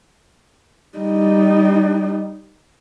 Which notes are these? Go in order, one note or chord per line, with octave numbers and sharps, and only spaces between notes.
G3 D#4